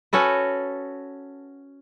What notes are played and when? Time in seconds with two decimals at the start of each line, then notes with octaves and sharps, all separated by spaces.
0.13 C#4 F#4 A4 B4